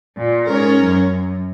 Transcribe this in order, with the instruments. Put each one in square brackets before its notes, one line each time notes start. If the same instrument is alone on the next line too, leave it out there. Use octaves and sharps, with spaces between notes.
[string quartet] A#2
[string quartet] G#2 [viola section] C#4 A#4 C#5
[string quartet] F#2
F#2